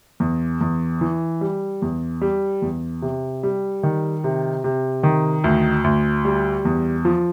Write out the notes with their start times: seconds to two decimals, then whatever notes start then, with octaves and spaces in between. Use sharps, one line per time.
0.20 E2
0.61 E2
1.01 E3
1.41 G3
1.82 E2
2.21 G3
2.62 E2
3.02 C3
3.43 G3
3.83 D#3
4.24 C3
4.64 C3
5.03 D#3
5.44 D2
5.84 D2
6.25 G3
6.65 E2
7.05 F3